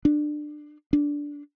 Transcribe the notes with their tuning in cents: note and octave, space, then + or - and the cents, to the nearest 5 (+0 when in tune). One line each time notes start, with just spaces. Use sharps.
D4 +25
D4 -10